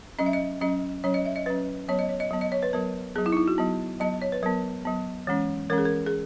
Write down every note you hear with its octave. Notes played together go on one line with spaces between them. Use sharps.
F#3 C#4 D#5
E5
D#5
F#3 C#4 D#5
F#3 C#4 C#5
D#5
E5
D#5
F#3 C#4 B4
F#3 B3 C#5
D#5
C#5
D#5
F#3 B3
D#5
C#5
B4
F#3 B3 A#4
F#3 B3 G#4
E4
D#4
E4
F#4
F#3 B3
F#3 B3 D#5
C#5
B4
F#3 B3 A#4
F#3 B3
E3 G#3 C#4
E3 G#3 C#4 A#4
G#4
A#4
G#4